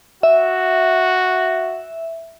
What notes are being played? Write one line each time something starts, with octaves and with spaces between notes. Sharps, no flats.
F#4 E5